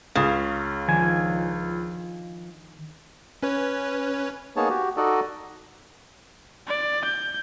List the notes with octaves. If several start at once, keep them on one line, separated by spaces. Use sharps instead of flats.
C#2 C#3
D#3 F3 D4 G#5
C#4 B4 C#5
A#3 B3 D#4 G#4 C#5 A5
F#4 G4
D#4 F#4 A4 D5 D#5
D5
G6